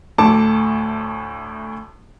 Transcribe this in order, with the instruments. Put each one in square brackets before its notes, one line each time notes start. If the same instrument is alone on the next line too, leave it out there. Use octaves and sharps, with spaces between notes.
[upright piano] D2 A2 A4 A5 D6